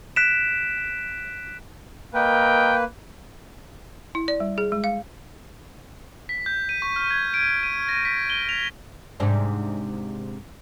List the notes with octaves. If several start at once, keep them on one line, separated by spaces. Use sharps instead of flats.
F#6 B6 D7 E7
A#3 A#4 B4 D#5 G5
E4
D5
G3
G#4
G#3
F5
B6
G6
D#7
C#6
F6
G#6
D7
D#7
A#6
B6
G7
F7
G#2 C3 D4